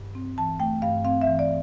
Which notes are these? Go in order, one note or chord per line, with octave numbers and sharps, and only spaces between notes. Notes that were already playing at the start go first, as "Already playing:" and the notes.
Already playing: G2
C4
E3 A5
A3 G5
G2 F5
C4 F5
E5
E3
D5